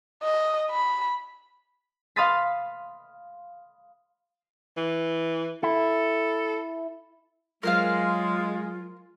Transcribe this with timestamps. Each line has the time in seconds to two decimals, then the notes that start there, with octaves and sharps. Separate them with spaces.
0.23 D#5
0.71 B5
2.16 F5 B5 C6 D#6 A6 B6
4.77 E3
5.63 E4 A4
7.63 F#3 G#3 F4 A#4 C5 F5